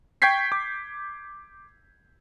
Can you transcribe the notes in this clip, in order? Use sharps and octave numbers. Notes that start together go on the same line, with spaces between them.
G5 C#6 G6 G#6 B6 C7
D6